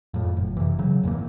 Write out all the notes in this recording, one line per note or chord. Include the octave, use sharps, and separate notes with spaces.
F2 A2
F#1
C3 E3
C#3 F#3
G#1 E2 E3 A#3